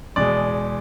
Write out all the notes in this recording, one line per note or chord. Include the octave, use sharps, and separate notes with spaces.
E2 B2 G#3 D5